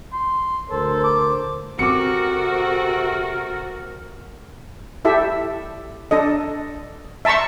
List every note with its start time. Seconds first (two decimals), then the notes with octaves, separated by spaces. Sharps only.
0.13 C6
0.70 D2 A4 A#4 C5
1.04 D6
1.79 C3 C4 F#4 A4 A#4 D6 C#7
5.05 E4 G4 A4 E5
6.11 D4 A4 D#5
7.25 E5 A5 A#5 C6 C#6